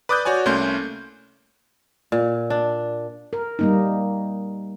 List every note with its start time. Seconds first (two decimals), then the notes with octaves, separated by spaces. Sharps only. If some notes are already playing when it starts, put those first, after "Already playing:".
0.09 B4 D5 D6 D#6 F#6 G6
0.25 F#4 C#5 D5 G#5
0.46 C2 A3 A#3 C#4 C6 G6
2.12 A#2
2.50 D4
3.33 A#4
3.59 G3 A#3 D#4